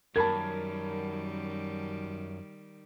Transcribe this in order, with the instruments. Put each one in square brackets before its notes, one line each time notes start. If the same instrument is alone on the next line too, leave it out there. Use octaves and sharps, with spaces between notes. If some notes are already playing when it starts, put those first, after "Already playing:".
[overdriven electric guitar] F#2 [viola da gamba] D#3 G3 [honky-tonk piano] A#4 [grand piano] A5 B5 G#6